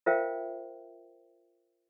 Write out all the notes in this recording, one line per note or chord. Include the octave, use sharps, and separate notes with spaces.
F4 A#4 C5 E5 F5 G5